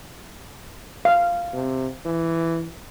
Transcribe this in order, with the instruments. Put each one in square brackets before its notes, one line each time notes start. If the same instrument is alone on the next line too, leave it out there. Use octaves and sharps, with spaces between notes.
[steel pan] F5
[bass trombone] C3
E3